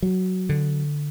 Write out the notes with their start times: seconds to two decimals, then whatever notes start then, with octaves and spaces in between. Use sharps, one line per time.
0.02 F#3
0.49 D3